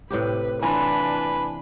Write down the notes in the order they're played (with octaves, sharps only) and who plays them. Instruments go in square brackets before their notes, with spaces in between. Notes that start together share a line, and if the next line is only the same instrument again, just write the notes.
[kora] A2 C3 G4 [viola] B4
[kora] E3 F4 [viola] D4 [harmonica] B4 [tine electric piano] G#5 B5